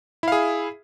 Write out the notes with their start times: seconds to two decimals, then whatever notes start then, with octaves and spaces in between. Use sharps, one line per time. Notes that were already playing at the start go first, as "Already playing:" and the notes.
0.23 E4
0.28 F5
0.32 G#4